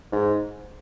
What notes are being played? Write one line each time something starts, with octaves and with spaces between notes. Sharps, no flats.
G#2